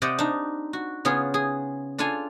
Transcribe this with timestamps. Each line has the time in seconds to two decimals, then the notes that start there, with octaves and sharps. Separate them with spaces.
0.02 C3 C4 G4 D5 D#5 F#5
0.18 D4 D#4
0.73 F#4
1.05 C#3 B3 F4 G#4
1.34 G#4
1.98 D4 F4 A4 F5 G#5